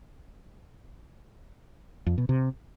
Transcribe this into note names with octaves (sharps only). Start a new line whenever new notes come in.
F2
B2
C3